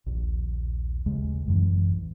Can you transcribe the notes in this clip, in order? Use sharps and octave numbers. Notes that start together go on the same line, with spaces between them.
A#1 D#2
D#2 C#3 G#3
A1 F#2 E3